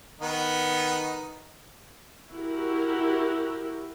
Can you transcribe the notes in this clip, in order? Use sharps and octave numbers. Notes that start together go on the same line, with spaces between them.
D#3 B3 D#4
E4 F#4 G4 A#4